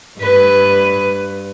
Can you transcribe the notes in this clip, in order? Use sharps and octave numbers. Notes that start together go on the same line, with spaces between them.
G2 B4